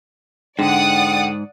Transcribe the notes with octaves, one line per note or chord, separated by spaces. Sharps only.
G#2 D3 D5 F#5 G5 D#6